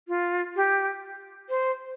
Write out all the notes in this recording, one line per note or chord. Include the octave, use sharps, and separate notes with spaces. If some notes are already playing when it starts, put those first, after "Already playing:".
F4
G4
C5